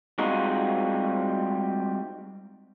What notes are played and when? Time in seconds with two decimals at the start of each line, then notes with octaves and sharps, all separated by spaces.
0.18 G3 G#3 C4 D#4 F4 F#4